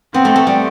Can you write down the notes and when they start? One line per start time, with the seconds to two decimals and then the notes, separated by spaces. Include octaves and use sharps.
0.14 B3 C4
0.25 A3
0.36 A3
0.47 G3